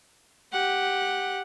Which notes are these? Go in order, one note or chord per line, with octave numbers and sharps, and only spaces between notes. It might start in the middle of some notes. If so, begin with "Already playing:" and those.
G4 F#5